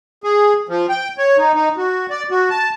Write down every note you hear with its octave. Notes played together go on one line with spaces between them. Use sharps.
G#4
F3
G5
C#5
D#4
D#4
F#4
D5
F#4
A5